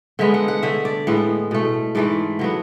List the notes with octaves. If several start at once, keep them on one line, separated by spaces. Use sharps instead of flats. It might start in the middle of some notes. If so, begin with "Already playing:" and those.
D3 G#3 B3 E5
F#5
F#5
D3 A3 E5
D5
A2 G#3 B3
B2 A3
G#2 E3 A3 D5
D3 F#3 B3